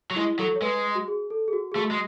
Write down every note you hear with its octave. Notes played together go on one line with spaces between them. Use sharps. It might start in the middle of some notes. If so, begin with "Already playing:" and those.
F#3
G#3 E4
F#3 A4
C#5
G#3 B4
F#4
G#4
A4
G#4
F#4
G#4
A3 F#4
G#3